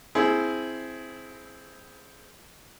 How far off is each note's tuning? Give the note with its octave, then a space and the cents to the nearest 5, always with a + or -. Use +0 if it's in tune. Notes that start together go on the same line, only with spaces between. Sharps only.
C4 +0 E4 +0 G#4 +15